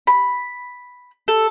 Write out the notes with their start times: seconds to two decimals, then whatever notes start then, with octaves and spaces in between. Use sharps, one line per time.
0.07 B5
1.28 A4